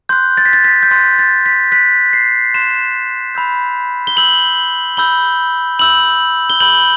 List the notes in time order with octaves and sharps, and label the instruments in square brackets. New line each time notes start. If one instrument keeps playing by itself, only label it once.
[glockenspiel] C6 F#6 G6
A6
B6
A6
B6
G6
C6 F#6 A6
A6
B6
C6 F#6 B6
C7
C6 F#6 E7
B5 E6 G6
G7
B5 E6 G6 F#7
B5 E6 G6 G7
B5 E6 G6 F#7
G7
B5 E6 G6 F#7